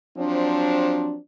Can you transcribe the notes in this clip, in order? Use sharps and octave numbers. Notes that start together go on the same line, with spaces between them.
F3 F#3 C4 D4